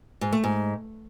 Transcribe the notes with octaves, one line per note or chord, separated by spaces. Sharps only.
G#2
A3
G#2